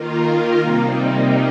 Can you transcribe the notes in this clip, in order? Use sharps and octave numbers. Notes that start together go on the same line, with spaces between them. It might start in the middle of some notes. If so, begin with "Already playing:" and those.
Already playing: D#3 A#3 F4 A#4
C3 G3 A#3 D#4